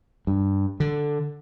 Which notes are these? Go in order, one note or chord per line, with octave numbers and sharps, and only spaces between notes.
G2
D3